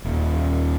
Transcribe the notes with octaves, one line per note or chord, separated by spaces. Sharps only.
D#1